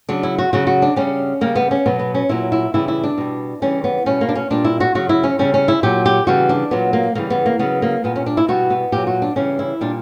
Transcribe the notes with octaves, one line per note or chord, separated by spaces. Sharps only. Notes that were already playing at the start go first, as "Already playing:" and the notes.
C#3 F#3 D4
E4
F#4
C#3 F#3 F#4
F#4
D4
C#3 G3 C#4
C#3 G3 A#3
B3
C#4
B2 F#3 B3
B3
C#4
A#2 F#3 E4
E4
C#3 E3 G3 E4
E4
D4
B2 G3
C#3 E3 G3 C#4
B3
B2 G3 C#4
A#3
D4
C#4
A#2 G3 D4
E4
F#4
C#3 F#3 F#4
E4
C#4
C#3 G3 C#4
C#4
E4
A#2 F#3 G4
G4
C#3 E3 G3 F#4
D4
A#2 F#3 B3
A#3
C#3 E3 G3 A#3
B3
A#3
C#3 F#3 B3
A#3
A#2 G3 B3
C#4
D4
E4
B2 G3 F#4
B3
A#2 F#3 G4
F#4
D4
C#3 E3 G3 C#4
E4
A#2 G3 D4